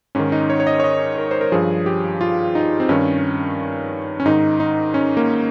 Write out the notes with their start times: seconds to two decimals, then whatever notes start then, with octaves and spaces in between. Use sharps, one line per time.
0.15 G#2 D#3 C#4
0.32 D#4
0.50 C#5
0.60 C#5
0.67 D#5
0.80 C#5
0.84 D#5
1.18 A#4
1.31 C5
1.41 A#4
1.52 G2 F3 G#4
1.86 G4
2.21 F4
2.55 D#4
2.80 C4
2.89 G2 D#3 C#4
4.20 C#4
4.26 G#2 D#3 D#4
4.60 D#4
4.94 C#4
5.17 A#3